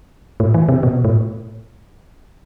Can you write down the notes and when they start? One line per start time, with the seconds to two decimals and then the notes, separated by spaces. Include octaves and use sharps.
0.40 A2
0.54 E3
0.69 C3
0.83 B2
1.05 A2